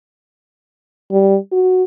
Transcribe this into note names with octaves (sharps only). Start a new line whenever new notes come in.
G3
F#4